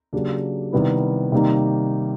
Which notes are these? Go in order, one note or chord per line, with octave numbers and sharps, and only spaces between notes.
C#3 F#3 A#3 D4 G4
C3 D#3 G3 B3 E4
C3 D#3 G3 A#3 D#4